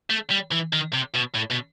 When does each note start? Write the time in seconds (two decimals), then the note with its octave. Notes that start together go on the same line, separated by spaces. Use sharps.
0.10 A3
0.31 G3
0.52 E3
0.73 D#3
0.93 C3
1.14 B2
1.35 A2
1.50 B2